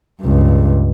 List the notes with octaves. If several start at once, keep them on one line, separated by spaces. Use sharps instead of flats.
C#2 G2